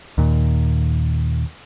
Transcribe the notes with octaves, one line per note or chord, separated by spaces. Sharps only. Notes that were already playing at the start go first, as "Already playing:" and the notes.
D#2 A#2